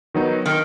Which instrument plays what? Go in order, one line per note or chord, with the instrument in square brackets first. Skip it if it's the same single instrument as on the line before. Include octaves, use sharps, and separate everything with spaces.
[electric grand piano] D#3 F#3 B3 D#4
[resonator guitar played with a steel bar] D#3